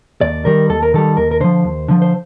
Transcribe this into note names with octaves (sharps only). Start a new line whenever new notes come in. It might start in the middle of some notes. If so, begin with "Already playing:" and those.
D#2 D5
D#3 G3 A#4
D#2 A4
A#4
D#3 G3 A4
D#2 A#4
A#4
D3 F3 C5
D#2
D3 F3
C5